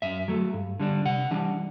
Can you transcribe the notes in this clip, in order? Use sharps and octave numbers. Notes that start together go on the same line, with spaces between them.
F#2 E5
F#3 A3
G2
D3 G3 D4
C3 F#5
E3 G3 D4